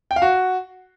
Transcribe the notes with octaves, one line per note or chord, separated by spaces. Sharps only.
G5
F5
F#4